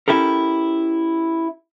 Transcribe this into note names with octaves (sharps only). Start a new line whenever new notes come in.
C#4 E4 G4 A4 A#4